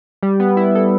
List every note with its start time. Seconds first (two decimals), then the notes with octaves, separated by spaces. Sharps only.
0.23 G3
0.40 B3
0.57 E4
0.75 A4